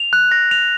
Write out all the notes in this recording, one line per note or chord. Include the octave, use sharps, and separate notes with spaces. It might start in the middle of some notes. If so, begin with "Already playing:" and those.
Already playing: F7
F#6
A#6
F7